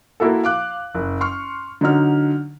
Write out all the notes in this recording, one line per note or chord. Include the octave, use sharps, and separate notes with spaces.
A#3 E4 F#4 A4
F5 D6 F#6
F#1
C6 C#6 F6
D3 F#3 D#4 F6